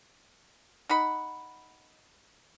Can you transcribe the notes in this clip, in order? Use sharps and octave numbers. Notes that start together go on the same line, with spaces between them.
D#4 F#5 B5